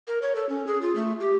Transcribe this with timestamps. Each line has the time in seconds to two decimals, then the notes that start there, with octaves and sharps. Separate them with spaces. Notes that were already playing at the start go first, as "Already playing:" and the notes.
0.08 A#4
0.22 C#5
0.35 A4
0.49 C#4
0.67 G#4
0.82 F4
0.96 A3
1.20 G4